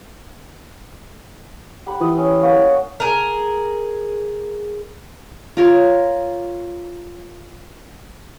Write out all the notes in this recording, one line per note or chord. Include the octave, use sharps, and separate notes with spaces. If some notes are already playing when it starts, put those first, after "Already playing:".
G4 F#5 B5
E3 D#6
C#4
A#3 C#5 F#5
G#4 A#4
F4 A#4 C#5